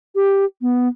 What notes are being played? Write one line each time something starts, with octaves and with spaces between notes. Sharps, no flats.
G4
B3